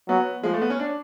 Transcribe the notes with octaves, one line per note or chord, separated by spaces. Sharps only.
F#3 B3
F3 G#3
A3
B3
C#4
D4